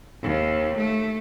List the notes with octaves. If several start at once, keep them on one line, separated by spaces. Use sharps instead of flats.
D#2
A3